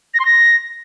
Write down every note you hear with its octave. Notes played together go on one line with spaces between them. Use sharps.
A#6
C6
A#6